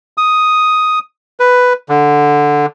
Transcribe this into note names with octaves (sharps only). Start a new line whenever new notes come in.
D#6
B4
D3